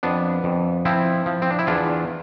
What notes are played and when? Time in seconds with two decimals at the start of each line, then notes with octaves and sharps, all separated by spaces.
0.03 F2 B3 D4
0.44 F2
0.85 F3 C4 E4
1.26 F3
1.42 C4
1.51 D4
1.59 E4
1.67 E2 D4 F4